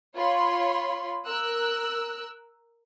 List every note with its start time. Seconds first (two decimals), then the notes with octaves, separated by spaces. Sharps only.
0.15 F4 C#5 B5 C6
1.25 A#4 E6 F#6